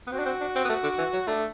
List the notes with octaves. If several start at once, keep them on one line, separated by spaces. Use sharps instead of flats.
B3
C4 F#4
D4
C4
D4
C4
B3
A3
D3
E3
F#3
A3 D4